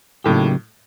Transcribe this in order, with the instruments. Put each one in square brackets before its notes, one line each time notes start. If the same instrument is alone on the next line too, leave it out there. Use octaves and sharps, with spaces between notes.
[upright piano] A2 [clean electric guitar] C#3 F#3 A#3 D#4 G4